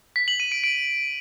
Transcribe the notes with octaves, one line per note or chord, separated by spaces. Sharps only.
B6
F#7
D#7
D7
D7